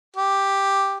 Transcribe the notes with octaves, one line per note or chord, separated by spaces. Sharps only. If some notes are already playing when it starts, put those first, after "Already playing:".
G4